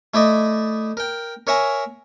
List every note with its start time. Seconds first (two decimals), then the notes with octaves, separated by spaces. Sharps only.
0.14 A3 E4 D5 D#5
0.97 A#4 G5
1.47 A#4 C#5 E5 G#5 A#5